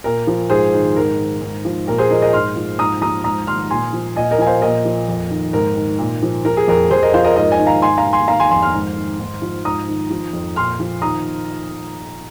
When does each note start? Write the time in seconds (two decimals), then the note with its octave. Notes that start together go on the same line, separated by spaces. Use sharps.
0.04 A#2 A#4
0.27 F3
0.50 G#2 G#4 C5
0.74 D#3
0.96 G#2 A#4
1.19 D#3
1.41 G#2
1.65 F3
1.87 A#2 A#4
1.98 G#4 C5
2.11 F3 A#4 D#5
2.22 A#4 D#5
2.33 G#2 C6 F6
2.56 F3
2.79 G#2 A#5 D#6
3.01 F3 A#5 D#6
3.24 G#2 A#5 D#6
3.47 D#3 C6 F6
3.71 A#2 G#5 C6
3.93 F3
4.16 A#2 D#5 G#5
4.31 A#4 D#5
4.39 F3 G#5
4.46 C5 F5
4.62 A#2 A#4 D#5
4.85 F3
5.08 F2
5.30 D#3
5.53 G#2 A#4
5.76 D#3
5.99 A#2
6.23 F3
6.45 F3 A#4
6.57 G#4
6.68 F2 A#4
6.90 F2 G#4 C5
7.02 A#4 D#5
7.14 F3 C5 F5
7.24 A#4 D#5
7.36 G#2 A#4 D#5
7.52 D#5 G#5
7.59 D#3
7.67 F5 A#5
7.82 G#2 G#5 C6
7.98 F5 A#5
8.05 D#3
8.13 G#5 C6
8.28 D#3 F5 A#5
8.40 G#5 C6
8.51 F2 G#5 C6
8.62 C6 F6
8.74 G#2
8.96 D#3
9.19 G#2
9.42 F3
9.65 G#2 A#5 D#6
9.89 D#3
10.11 F3
10.33 F2
10.56 A#2 C6 F6
10.80 F3
11.02 D#3 A#5 D#6